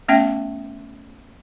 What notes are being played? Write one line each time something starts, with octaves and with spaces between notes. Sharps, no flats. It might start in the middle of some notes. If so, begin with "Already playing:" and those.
A3 B3 C#4 E5 G5